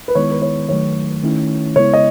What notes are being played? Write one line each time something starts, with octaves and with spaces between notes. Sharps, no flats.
B4
D#3 G#3 B3 E4 C#5
B4
C#5
D#3 F#3 A3 C#5
D#3 A3 C#4 E4
C#3 G#3 B3 E4 C#5
D#5